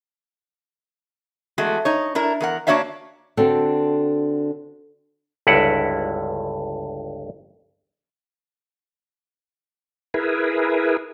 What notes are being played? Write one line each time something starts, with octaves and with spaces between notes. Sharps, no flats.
E2 G#3 A3 F#4
D#4 C#5
D4 E4 A#4
E2 A#4 F#5
A#3 D4 F#4 C#5 E5 F5
D3 C4 D4 F#4 A4
G1 C#2 G2 E4 F#5
E4 G#4 A#4 B4